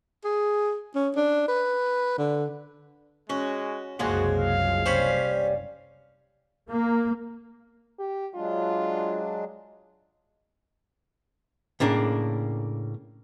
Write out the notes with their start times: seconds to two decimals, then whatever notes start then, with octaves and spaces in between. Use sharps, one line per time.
0.24 G#4
0.95 C#4
1.16 D4
1.48 B4
2.18 D3
3.30 G#3 C#4 F#4
3.99 F#1 C2 F3 F#3 G#3 A#3 F#4
4.38 F5
4.86 G3 C#4 C5 C#5 B5
6.70 A#3
7.99 G4
8.35 F#3 G#3 D4 F4
11.80 A2 C#3 A#3 D4